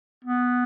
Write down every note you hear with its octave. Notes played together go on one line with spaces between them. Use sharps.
B3